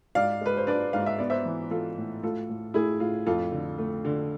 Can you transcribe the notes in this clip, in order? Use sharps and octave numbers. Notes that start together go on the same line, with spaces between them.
G#2 D5 F5
G#3 B4
C5
D4 B4 D5
G#2 F5
E5
B3 D5
C5 E5
E3
E3 F4 A4
A2
A2 F4 A4
A2
A2 E4 G#4
A2 F4
F2 F4 A4
D3
A3
D3